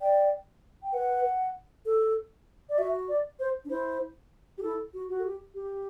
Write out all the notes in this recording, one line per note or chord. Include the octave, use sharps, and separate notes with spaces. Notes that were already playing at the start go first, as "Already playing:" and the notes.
D5 G5
G5
B4 F#5
A4
D5
F#4 E5
D5
C5
D4
E4 C5
G4
E4 A4
F#4
F#4
A4
G4
G4